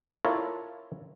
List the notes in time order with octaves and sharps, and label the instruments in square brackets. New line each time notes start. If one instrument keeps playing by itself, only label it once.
[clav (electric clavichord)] E4 F4 A4 A#4 C#5 D5